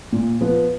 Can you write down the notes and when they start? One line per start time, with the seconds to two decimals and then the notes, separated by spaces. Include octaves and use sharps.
0.12 A#2
0.41 F3 B3